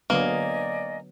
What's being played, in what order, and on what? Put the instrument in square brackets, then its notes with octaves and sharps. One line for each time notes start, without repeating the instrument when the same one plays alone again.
[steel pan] D3 F#3 B3 [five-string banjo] A#3 [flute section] D5 D#5 G#5